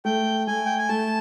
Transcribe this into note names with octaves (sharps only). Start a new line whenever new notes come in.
A3 G5
A3 G#5
G5
G#5
A3 A5